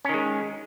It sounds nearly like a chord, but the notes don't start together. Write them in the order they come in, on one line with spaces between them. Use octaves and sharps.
C#4 D#3 G#3